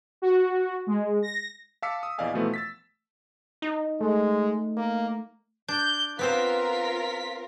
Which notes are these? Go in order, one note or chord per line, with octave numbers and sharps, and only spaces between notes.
F#4
G#3
A#6
F5 A5 D6 E6 B6 C#7
D#6
A#1 E2 D5 D#5 F5 G#5
B2 E3 F3 A3 B3
E6 A6 B6
D#4
G#3 A3
A#3
D4 G6
B3 C4 F4 A#4 C5 B6